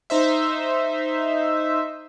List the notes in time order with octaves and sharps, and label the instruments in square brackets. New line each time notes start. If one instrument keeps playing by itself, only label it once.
[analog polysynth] D#4 C5 E5